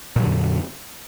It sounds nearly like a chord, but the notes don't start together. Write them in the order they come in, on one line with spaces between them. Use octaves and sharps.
A#2 F#3 D3 F2